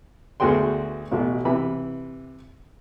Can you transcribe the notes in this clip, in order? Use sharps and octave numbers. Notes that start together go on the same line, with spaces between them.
D2 B3 F#4 G#4 G5 C6
A1 B2
C3 E3 B5